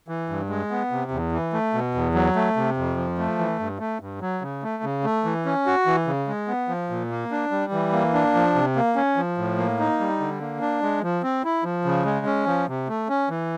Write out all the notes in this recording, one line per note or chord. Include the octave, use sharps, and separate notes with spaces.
E3
G2
G#3
B3
C3
E2
E3
A3
B2
E2
F#3
A3
C3
F2
F3
A3
E3
G2
A3
G2
F#3
C#3
A3
C#3
A3
E3
C#4
F#4
E3
C#3
G#3
B3
F3
A#2
A#3
D4
G3
E3
A#3
D4
F3
C3
A#3
C#4
F3
A2
A#3
D#4
G3
D3
A#3
D4
G#3
F3
C4
E4
F3
C#3
G#3
C#4
F3
C3
A3
C#4
E3